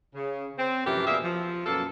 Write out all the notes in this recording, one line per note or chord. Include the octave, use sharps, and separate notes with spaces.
C#3
C4
F#2 A2 C3 E3 F3 G4
B2 G3 A#3 G#4 E5
F3
F#2 B2 A#3 A4